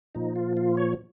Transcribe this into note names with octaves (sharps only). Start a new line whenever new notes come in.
A#2 F3 D#4
F4
F4
C#5